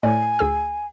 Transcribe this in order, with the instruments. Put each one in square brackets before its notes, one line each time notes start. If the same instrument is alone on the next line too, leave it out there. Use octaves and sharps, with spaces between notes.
[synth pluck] A2 [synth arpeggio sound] D5 [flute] G#5
[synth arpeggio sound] D2 G#4 E6